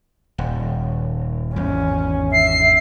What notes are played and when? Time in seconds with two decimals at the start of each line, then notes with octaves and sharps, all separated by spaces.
0.38 D#1
1.56 G#1 E2 C#4
2.33 E5 C7